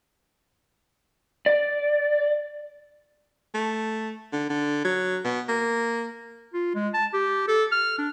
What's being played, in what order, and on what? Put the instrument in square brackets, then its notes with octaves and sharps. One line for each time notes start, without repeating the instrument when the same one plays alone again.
[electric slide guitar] D5
[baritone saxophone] A3
D3
D3
F#3
B2
A#3
[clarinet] F4
G#3
A5
G4
A4
F6
D4